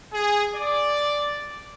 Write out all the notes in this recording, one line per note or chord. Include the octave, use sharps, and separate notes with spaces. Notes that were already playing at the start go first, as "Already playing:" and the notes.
G#4
D5